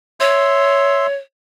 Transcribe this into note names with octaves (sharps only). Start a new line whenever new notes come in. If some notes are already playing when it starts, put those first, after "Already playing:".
C#5 E5 C6